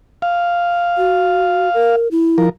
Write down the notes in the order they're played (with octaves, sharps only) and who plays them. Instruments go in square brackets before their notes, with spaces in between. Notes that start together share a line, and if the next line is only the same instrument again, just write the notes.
[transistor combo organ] F5
[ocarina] F#4
A#4
E4
[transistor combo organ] F3 A#4